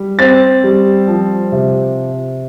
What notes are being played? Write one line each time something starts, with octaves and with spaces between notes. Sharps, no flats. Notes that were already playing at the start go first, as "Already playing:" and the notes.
Already playing: G3
C4 A6
G3
F3
C3